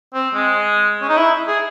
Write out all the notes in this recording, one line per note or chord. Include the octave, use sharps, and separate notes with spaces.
C4
G#3
C#4
D#4
E4
G#4